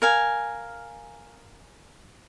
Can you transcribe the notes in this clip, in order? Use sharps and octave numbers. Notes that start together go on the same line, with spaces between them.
A#4 F5 G#5